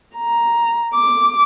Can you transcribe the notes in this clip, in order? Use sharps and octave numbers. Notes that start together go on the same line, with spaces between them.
A#5
D6